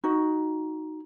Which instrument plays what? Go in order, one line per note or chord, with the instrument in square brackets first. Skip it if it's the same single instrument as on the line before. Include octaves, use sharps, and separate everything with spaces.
[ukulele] D#4 F#4